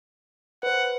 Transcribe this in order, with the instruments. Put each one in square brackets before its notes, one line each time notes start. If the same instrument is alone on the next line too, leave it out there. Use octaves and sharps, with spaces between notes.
[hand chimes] B4 C5 [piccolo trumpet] F#5